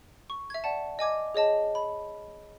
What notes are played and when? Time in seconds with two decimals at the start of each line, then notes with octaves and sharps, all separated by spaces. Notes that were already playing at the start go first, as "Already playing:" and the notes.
0.30 C#6
0.50 E5 G#6
0.64 D5 F#5 A5
0.99 D#5 G#5 D6 G#6
1.34 G#4 C#5 D#5 A5
1.75 B5